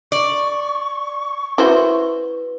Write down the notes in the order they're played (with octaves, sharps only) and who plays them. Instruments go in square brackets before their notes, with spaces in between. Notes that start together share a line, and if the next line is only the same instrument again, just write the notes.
[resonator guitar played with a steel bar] D5 [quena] C#6
[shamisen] E4 F#4 C5 [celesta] B4